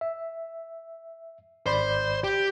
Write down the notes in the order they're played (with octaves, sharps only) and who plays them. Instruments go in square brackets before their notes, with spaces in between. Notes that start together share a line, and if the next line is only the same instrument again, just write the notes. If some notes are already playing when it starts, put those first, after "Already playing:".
[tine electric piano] E5
[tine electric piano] G#1 D5 B5 [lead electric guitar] C5
[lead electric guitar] G4